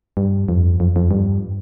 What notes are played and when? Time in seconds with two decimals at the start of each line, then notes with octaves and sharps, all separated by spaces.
0.17 G2
0.49 F2
0.80 F2
0.96 F2
1.11 G2